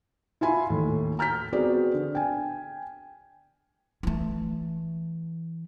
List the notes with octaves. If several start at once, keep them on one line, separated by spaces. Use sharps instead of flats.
E4 F4 G#5 B5 C6
D#2 A2
A#5 F6 G6 B6
B3 C4 F#4 G#4 D5
D3
G5 G#5
E3 A3